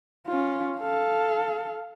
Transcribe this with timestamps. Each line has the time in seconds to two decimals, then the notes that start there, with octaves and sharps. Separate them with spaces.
0.27 C#4 F4
0.77 A4 F5